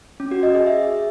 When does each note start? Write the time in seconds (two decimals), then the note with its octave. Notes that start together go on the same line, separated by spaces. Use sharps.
0.20 C#4
0.31 F#4
0.43 D#5
0.55 G#4
0.66 E5